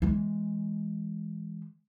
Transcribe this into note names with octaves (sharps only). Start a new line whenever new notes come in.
E3 G#3